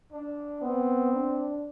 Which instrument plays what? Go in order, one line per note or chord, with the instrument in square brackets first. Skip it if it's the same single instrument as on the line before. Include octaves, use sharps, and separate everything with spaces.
[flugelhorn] D4
[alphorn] B3 [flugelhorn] C4
[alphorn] D4